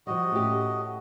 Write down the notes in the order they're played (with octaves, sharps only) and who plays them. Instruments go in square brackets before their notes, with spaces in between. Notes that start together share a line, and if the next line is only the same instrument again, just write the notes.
[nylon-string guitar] F3 G3 [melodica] F#4 D#5
[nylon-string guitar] A2 C#4 G4